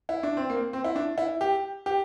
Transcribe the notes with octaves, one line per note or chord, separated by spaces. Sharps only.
E4
D4
C4
A#3
C4
E4
D4
E4
G4
G4